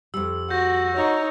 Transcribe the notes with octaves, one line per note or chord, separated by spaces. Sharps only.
F2 G3 E6
F#4 G6 A#6
D#4 C#5